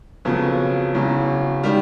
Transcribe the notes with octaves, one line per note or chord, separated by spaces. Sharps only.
F2 C#3 F#3 B3
E2 C#3 F#3
D#3 G3